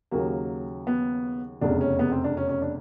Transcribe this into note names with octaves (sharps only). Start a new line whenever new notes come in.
D#2 C#3 F#3 A#3
B3
F1 E2 C#3 D4
C#4
B3
C4
D4
C#4
C#4
D4